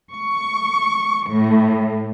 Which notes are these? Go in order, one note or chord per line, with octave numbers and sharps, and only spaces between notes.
C#6
A2